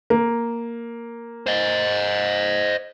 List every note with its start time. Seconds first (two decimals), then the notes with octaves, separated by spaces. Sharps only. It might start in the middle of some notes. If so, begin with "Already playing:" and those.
0.10 A#3
1.47 C5 D#5